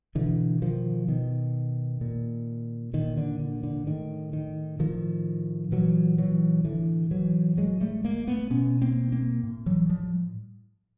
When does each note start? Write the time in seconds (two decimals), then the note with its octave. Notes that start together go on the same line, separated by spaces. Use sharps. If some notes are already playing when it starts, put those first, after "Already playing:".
0.15 B2 D3 E3
0.62 D#3 F3
1.08 B2 D#3
2.01 A#2
2.93 A#2 D#3
3.17 D3
3.40 D3
3.63 D3
3.86 A2 D#3
4.33 D#3
4.79 A2 D#3 F3
5.72 A#2 E3 F#3
6.18 E3 F#3
6.64 A2 D3 E3
7.11 E3 F#3
7.57 A2 F#3 G#3
7.81 G3 A3
8.04 G#3 A#3
8.27 A3 B3
8.50 B2 B3 C#4
8.81 A#3 C4
9.12 A#3 C4
9.43 A2
9.66 E3 F#3
9.90 F3 G3